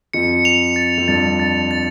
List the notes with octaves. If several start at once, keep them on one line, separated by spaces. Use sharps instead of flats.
F2 C#7
F7
A6
F2
G2 A6
A6
A6